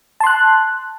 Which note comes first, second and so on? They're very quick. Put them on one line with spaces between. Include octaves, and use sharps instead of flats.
A5 C6 F#6